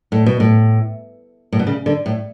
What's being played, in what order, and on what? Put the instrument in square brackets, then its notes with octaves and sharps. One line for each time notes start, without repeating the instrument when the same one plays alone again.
[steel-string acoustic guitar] A2
B2
A2
A2
B2
C#3
D3
A2